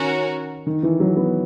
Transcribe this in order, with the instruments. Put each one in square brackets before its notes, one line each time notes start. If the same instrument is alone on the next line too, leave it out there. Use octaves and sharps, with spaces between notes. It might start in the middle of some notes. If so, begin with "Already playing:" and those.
Already playing: [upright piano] D#3 [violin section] C#4 F#4 A#4
[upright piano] D#3
E3
F#3
B3